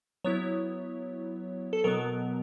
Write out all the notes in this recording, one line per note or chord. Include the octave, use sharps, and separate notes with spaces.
F#3 B3 E4 C#5
A4
B2 F#3 B3 A#4